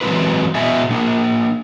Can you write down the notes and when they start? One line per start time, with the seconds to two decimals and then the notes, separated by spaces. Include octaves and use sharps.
0.01 E3 F#3 G#3 C4 F4 B4
0.55 B2 B3 F#4 D#5 E5 G#5
0.91 A#3 D4